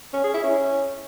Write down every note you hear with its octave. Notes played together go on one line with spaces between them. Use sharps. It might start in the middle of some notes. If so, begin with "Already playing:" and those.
C#4
G#4
E4
C#4